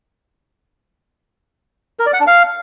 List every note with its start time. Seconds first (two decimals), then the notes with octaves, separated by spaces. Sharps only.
1.99 A#4
2.06 D5
2.13 F#5
2.20 D4
2.27 F5